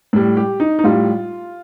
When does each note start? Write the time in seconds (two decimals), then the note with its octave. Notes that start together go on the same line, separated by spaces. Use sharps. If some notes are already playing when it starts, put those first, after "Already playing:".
0.13 A2 G3
0.37 G4
0.60 D#4
0.79 D#4
0.84 A2 G3 F4